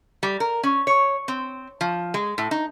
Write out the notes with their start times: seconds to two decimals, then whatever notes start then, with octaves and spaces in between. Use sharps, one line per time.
0.23 G3
0.40 A#4
0.63 C#4
0.87 C#5
1.28 C4
1.81 F3
2.14 G#3
2.38 A2
2.51 D#4